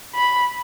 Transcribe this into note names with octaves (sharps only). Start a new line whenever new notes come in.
B5